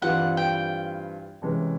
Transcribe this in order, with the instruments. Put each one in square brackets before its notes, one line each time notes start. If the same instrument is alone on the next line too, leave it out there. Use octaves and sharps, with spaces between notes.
[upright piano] G2 E3 G3 C4 F4 [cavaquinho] F#5
[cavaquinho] G5
[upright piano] C3 E3 G#3 C#4